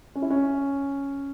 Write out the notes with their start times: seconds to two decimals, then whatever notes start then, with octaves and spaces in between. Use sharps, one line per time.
0.15 C#4
0.22 E4
0.30 C#4